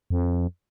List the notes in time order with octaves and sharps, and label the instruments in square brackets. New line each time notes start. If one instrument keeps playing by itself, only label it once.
[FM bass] F2